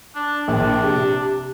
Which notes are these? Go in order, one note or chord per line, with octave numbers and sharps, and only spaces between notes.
D4
A#1 D4
C3